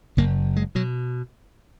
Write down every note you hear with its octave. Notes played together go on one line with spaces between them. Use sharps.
F#1 F#2 C#3 A#3
G#3
B2 F#3